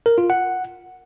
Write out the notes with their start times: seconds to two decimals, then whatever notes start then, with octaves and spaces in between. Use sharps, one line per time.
0.06 A#4
0.18 F4
0.30 F#5